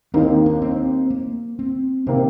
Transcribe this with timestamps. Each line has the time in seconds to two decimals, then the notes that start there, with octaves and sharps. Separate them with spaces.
0.14 D#2 D#3 A#3 C4 D#4
0.46 D4
0.62 C4
1.10 A#3
1.59 C4
2.07 C3 D#3 A#3 C4